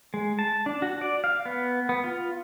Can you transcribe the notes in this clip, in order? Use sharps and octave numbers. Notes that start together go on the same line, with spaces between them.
G#3
A5
D4
F#4
D5
F5
B3
B3
F4